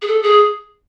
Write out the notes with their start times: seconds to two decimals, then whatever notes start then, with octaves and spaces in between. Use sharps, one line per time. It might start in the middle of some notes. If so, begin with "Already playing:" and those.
0.01 G#4
0.07 A4
0.22 G#4